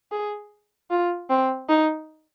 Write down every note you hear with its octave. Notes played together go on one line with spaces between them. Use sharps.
G#4
F4
C4
D#4